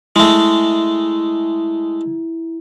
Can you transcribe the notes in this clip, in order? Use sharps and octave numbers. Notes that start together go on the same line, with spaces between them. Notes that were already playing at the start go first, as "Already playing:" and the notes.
G#3 A3 E4